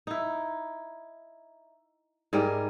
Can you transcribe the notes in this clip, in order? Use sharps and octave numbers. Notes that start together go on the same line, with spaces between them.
D#4 E4
G#2 G3 G#4 A#4